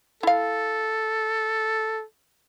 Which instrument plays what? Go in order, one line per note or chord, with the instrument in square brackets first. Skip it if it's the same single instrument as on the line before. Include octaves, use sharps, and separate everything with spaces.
[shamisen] E4 F5 [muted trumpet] A4